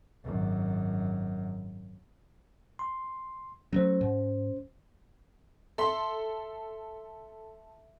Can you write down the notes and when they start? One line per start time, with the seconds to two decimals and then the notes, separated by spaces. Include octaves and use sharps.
0.24 G#1 F#2
2.79 C6
3.73 F#3 G#3 A3 C#4 C5
4.01 G#2
5.78 A4 E5 C6 B6 G7